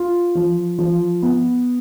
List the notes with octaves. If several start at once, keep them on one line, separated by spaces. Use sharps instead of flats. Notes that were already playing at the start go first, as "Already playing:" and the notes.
Already playing: F4
F3
F3
B3